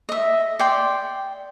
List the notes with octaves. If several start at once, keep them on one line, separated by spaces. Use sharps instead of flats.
D#5 E5
D5 G5 C6